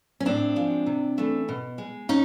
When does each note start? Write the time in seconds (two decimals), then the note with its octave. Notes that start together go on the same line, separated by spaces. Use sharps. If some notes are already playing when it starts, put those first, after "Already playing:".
0.20 C#4
0.25 A2 C4 D4
0.56 F3 G#3
0.86 C3
1.18 E3 A3
1.49 B2
1.78 G#3
2.09 C#4 D#4